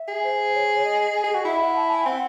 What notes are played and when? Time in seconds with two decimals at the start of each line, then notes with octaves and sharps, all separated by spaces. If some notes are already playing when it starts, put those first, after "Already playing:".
Already playing: E5
0.08 G#4
0.23 C5
0.54 C#5
0.80 C#5
0.85 D#5
1.24 G#4
1.35 F#4
1.45 E4 E5
1.61 F#5
1.76 A5
1.91 G#5
2.06 C4 F#5